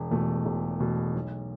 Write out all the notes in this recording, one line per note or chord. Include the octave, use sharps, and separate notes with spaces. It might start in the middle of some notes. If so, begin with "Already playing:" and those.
Already playing: E1
E2 B2 A3
E1
E2 B2 A3
B1